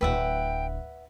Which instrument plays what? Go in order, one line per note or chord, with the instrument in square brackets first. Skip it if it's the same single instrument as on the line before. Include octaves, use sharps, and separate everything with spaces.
[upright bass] D1 [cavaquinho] B4 E5 F#5 [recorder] G5